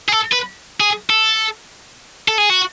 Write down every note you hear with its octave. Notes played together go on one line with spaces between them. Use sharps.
G#4
A4
B4
G#4
A4
A4
G#4
F#4